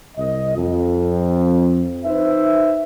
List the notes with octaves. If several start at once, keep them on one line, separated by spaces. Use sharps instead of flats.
C2 D#5
F2
D#4 B4 C5 E5